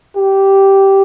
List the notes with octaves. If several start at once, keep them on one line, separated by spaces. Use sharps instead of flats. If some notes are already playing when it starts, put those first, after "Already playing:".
G4